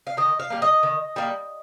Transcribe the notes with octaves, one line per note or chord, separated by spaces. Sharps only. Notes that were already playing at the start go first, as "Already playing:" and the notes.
F5
D#3 D#5
F5
G3 A#3
D#5
D#3
G3 A#3